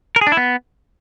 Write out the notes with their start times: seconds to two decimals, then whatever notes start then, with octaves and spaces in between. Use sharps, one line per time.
0.16 A#4
0.21 G#4
0.27 D4
0.32 E4
0.37 B3